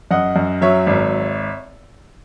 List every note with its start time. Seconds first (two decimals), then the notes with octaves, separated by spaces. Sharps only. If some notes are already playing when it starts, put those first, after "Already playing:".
0.11 F#2 D#5 F#5
0.36 F#2
0.61 F#3 C#5 E5
0.87 G#1